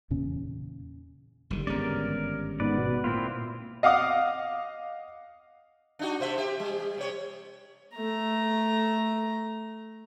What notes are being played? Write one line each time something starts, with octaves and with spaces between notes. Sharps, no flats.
E2 A#2 C#3 C#4
F#1 D3 D#3 G3
G#1 G2 G#3 B3 C#4 A#4 D5
G#2 B3 B4 D5
B2
A#2 C4 E4 F4
D#5 F5 F#5 D6 D#6
D4 D#4 F#4
C3 C5 E5
G4 E5
G3
C3 C#5
A3 A#5